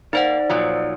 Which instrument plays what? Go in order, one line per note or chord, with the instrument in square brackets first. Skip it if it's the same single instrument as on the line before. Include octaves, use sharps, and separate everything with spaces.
[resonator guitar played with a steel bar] A#3 [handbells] D#4 C5 F#5 [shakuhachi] D5
[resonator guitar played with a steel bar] A#2 F3 F#3